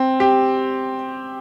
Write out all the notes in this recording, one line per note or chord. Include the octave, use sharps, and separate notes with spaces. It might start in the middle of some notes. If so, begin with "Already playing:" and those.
Already playing: C4
G4